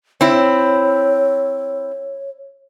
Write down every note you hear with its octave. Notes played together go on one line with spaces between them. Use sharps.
C4 E4 C#5